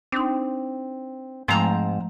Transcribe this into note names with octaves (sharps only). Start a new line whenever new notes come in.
C4 D4 D#4
G#2 F3 G#3 A3 C4 A#5